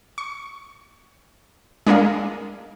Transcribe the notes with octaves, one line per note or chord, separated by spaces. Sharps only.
C#6
G#3 D4 G#4 A#4 D#5 F5